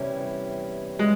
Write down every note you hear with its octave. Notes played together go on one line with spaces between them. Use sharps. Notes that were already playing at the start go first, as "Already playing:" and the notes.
Already playing: E2 C3 G3 C#4 E4
G#3